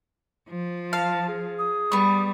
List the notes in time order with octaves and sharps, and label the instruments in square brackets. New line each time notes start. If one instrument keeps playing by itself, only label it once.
[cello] F3
[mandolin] F5 [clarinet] A5
[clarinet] G#4
[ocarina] D#6
[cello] G3 [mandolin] B3 C#6